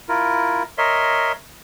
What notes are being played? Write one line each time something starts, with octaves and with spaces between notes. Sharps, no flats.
E4 F4 A#4
A#4 C#5 D#5 E5 C6